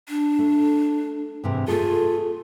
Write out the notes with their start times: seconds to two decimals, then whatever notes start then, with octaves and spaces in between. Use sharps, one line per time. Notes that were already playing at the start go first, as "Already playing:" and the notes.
0.09 D4
0.39 A3
1.44 G#2 C3 E3
1.68 A3 F4 G#4 A4